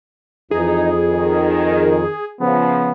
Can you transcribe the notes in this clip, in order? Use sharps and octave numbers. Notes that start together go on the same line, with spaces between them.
F2 E3 D#4 G#4
D#3
C#3 F3 B3